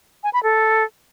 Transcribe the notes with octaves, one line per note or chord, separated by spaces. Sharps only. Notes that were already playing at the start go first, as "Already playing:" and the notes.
G#5
B5
A4